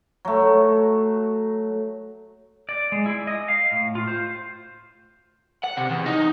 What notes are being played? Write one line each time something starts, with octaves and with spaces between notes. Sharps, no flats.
F#3 A3
D5
G#3
E4
D#5
F5
A2
F4
C5
F#5
C3
E2
D#4